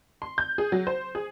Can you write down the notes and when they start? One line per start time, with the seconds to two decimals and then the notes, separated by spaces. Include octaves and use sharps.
0.22 C6
0.38 G6
0.58 G#4
0.72 F#3
0.87 C5
1.15 G#4